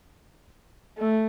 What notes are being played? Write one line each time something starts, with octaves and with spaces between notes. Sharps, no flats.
A3